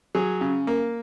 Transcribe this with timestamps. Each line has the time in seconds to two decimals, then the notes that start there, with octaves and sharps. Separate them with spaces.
0.15 F#3 G#4
0.41 C#3
0.67 A#3